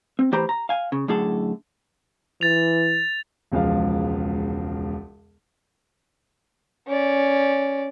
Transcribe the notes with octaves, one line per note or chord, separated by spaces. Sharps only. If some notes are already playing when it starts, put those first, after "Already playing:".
C4
A2 E3 G4 C5 A#5 B5
A#5
F5 G#5
C#3
F#2 A2 D3 G#4 A4
E3 A6 F7
E1 C#2 F3 F5
C#4 D5